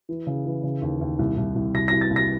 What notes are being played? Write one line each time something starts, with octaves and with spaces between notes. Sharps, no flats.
E3
C#3
E3
C#3
D#2
D#2
C2
C2
C2
C2 A#6
C2 A#6
A6
C2
A#6